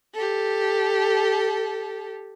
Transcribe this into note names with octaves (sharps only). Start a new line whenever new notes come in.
G4 A4